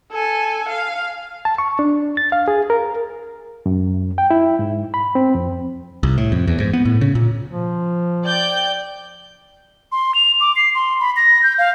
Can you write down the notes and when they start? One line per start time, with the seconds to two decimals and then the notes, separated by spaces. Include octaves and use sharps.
0.12 A4 G#5
0.69 F5
1.45 A5
1.58 C#6
1.79 D4
2.17 A6
2.32 F5
2.48 G#4
2.70 A#4
3.66 F#2
4.18 G5
4.31 E4
4.59 G#2
4.94 B5
5.15 C4
5.35 F2
6.03 C2
6.18 A2
6.32 F2
6.47 E2
6.60 G#2
6.73 B3
6.85 A2
7.01 C#3
7.15 A#2
7.51 F3
8.25 D5 G5 G6
9.92 C6
10.15 F7
10.41 D6
10.56 C7
10.75 C6
11.00 B5
11.16 A#6
11.43 G6
11.58 F5